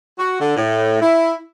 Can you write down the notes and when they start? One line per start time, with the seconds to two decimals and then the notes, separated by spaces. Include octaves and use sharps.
0.19 F#4
0.40 D3
0.57 A2
1.01 E4